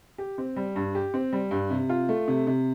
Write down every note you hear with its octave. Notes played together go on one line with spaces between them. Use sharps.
G4
C4
G3
G2
G4
C4
G3
G2
C3
F4
A3
C3
C3